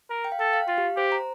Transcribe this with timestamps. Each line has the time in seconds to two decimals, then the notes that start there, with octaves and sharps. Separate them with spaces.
0.10 A#4
0.25 G5
0.32 F5
0.39 A4 G5
0.53 F5
0.68 F4 F5
0.78 G4
0.96 G4 C5
1.12 A#5